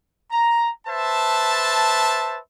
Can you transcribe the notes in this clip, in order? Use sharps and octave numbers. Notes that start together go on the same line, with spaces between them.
A#5
B4 C5 E5 A5